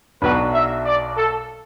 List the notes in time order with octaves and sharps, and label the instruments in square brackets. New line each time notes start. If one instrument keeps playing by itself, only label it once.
[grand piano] B1 B2 F#3 D4 F#4 [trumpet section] B4
[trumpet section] E5
D5
A4